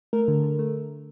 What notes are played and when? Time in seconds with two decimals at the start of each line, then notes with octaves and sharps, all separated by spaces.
0.13 A3 A#4
0.28 D3
0.44 D3
0.59 A3